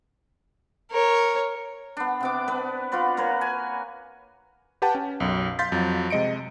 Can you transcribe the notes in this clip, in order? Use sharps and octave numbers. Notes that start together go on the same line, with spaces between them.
A#4 C#5
B3 D4
C3 B3 D6
B3 D4 B4
F4 F#4 B4 D5
A#3 F#4 B4 C#5
G#5
G4 B4 F#5 G5 A5
C#4
B1 F#2
F5 C6 G6 A6 B6
F2 F#3
C3 G#3 D#5 C#7 D7